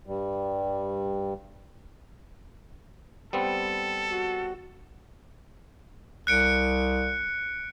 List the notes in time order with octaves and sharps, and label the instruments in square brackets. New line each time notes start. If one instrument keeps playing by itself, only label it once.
[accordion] G2 G3
[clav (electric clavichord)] G3 B3 C4 [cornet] A4
[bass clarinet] F#4
[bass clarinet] C2 [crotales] F#6 C#7 D7